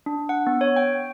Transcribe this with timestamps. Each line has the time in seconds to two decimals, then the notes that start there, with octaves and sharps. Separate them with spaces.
0.06 D4
0.29 F#5
0.47 B3
0.61 C#5
0.76 G5